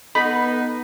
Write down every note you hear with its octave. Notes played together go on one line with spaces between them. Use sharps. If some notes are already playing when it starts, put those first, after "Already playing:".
B3 D#4 A4 B5